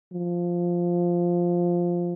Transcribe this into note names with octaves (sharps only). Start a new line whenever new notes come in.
F3